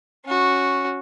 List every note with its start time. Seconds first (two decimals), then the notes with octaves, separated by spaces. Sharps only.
0.25 C#4 F#4